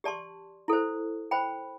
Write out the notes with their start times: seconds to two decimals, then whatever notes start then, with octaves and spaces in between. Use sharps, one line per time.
0.04 G4 D5 A5 C6
0.68 E4 A4 C5
1.31 C5 G5 B5